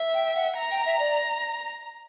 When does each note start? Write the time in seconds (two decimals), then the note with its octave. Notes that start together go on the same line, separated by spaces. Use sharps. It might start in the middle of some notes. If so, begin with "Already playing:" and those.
Already playing: E5
0.14 G5
0.35 F#5
0.57 A#5
0.71 G5
0.85 E5
0.99 D5